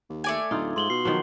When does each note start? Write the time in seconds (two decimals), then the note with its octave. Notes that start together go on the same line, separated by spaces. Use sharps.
0.10 D#2
0.24 A3 D5 G#5
0.51 D1 D#4 F4
0.76 G#2 C6 F#7 G7
0.90 B2 C7
1.05 D#3 F3 F#3